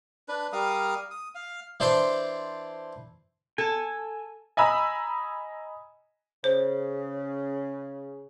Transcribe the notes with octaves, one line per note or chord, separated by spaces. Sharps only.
D4 B4
G3 A#4 F5 D#6
D#6
F5
E3 D4 C5 D5
A4 G#5
D#5 G#5 A#5 B5 E6
C#3 C5